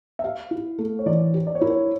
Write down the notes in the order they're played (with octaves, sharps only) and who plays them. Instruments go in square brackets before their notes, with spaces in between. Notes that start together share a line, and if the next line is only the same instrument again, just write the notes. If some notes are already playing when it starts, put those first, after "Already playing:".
[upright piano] E5
[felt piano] G4 [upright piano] F5
[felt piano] E4
A3
[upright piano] C#5
[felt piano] E3 [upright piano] D5
[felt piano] G4
[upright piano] D5
C#5
[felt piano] E4 [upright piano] A#4
[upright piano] C#5